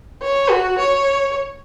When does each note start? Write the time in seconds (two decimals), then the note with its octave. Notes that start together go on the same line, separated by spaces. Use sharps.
0.22 C#5
0.50 F#4
0.79 C#5